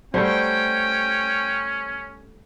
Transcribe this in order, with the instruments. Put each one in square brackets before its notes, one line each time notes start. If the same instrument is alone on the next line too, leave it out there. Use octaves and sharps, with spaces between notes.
[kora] G3 A3 F#5 [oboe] C#4 [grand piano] C5 [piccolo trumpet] G5